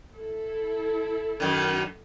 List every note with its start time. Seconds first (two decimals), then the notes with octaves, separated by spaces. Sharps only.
0.14 E4 A4
1.40 F#2 D#3